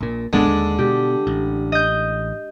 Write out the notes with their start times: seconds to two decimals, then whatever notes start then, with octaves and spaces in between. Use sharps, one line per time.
0.01 A#1 A#2
0.33 D#1 G#1 D3 G#3 B3 D4
0.47 D#2
0.79 B2 G4
1.27 A1
1.72 D#5 G6